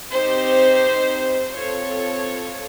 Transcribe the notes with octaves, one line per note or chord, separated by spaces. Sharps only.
C4 D#4 G4 C5
C4 F4 A4 C#5